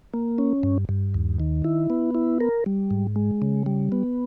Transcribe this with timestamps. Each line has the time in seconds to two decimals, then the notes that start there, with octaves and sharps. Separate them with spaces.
0.14 A#3
0.38 C#4
0.63 G2
0.89 G2
1.14 D#2
1.40 D#3
1.64 E4
1.90 B3
2.15 E4
2.40 A#4
2.66 G3
2.91 G#2
3.16 G#3
3.42 C#3
3.66 G3
3.92 B3